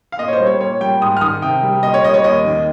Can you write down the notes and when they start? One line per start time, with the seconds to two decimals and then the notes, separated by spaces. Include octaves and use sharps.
0.12 F5
0.19 A#2 D#5
0.28 C#5
0.33 C5
0.40 G3
0.46 C#5
0.60 A#2 C#5
0.81 G3 G5
1.01 G#2 D#6
1.17 F6
1.21 D#3 D#6
1.42 C3 G5
1.63 G3
1.83 A#2 D#5
1.94 C#5
2.04 G3 D#5
2.14 C#5
2.24 D#2 D#5
2.45 D#3